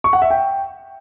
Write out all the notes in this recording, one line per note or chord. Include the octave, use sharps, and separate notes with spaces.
C#6
F#5
E5
G5